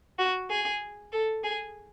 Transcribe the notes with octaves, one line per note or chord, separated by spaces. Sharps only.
F#4
G#4
A4
G#4